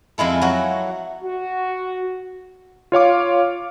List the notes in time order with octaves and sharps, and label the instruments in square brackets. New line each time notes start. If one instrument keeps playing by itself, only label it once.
[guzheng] F2 G#3 E4 A4
F#3 F#4
[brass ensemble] F#4
[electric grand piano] F4 C#5 F5 D6